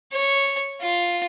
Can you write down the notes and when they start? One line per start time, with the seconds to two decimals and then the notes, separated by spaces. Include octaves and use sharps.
0.13 C#5
0.81 F4